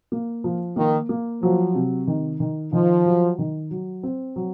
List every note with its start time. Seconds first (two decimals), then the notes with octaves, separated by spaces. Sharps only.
0.12 A#3
0.44 F3
0.76 D#3 A#3
1.09 A#3
1.42 F3 F#3
1.75 C3
2.07 D#3
2.40 D#3
2.72 D#3 F3
3.05 F#3
3.39 D#3
3.71 F#3
4.03 C4
4.36 F#3